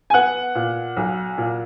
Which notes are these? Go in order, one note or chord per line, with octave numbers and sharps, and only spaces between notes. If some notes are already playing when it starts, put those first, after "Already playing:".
G#5
B3 F#5
A#2
B1
A#2